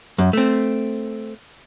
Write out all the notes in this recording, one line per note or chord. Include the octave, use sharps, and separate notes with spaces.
F#2
A3 C4